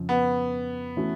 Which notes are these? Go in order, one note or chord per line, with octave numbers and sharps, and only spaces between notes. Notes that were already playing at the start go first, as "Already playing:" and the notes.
Already playing: F2 C#3 F3
B3
E3 A3 C#4 F#4